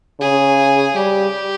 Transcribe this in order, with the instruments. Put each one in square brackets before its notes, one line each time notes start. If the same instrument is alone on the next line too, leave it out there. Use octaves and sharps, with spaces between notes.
[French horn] C#3 [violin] G#4
[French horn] G3 [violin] G4